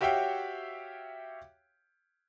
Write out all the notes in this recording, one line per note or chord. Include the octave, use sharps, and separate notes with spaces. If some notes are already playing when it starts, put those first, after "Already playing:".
F#4 G4 C#5 E5 F5 G5